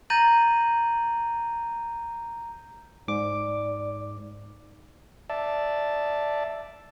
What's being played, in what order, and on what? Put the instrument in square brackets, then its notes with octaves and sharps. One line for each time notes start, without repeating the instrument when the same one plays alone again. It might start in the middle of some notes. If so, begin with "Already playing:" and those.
[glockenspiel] A#5 G6 A6 A#6 D#7 F#7
[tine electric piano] G#2 D6 [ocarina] D5
[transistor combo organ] D5 E5 A5